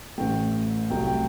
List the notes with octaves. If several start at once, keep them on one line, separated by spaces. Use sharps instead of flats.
A1 A2 A3 G5
C2 C3 F#3 A3 G5
G5